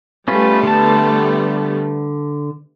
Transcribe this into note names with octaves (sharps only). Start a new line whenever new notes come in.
G3 A3 B3 C#4 F4 B4
D3 A5